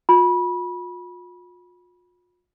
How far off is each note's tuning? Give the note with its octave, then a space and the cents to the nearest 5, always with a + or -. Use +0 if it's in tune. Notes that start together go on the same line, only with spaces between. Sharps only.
F4 +40 B5 -25